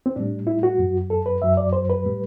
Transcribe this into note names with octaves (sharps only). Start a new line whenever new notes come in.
C4
A2 G3 D4
E4
F#4
F#2 F#3
A4
B4
F#2 F#3 E5
D5
C5
B4
A2 G3